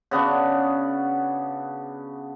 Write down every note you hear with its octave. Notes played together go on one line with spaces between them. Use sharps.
C#3 B3 D4 F#4